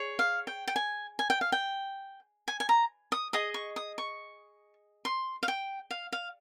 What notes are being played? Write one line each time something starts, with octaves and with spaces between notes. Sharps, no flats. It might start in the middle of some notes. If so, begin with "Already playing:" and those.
Already playing: G#4 C#5
F5
G5
G5
G#5
G#5
G5
F5
G5
G#5
G#5
A#5
D#6
G#4 D#5 D#6
C#6
D#6
C#6
C6
F5
G5
F5
F5